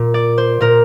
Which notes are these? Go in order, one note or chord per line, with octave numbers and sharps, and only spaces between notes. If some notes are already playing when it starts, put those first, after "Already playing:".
Already playing: A#2
D5
C5
A#2 A#4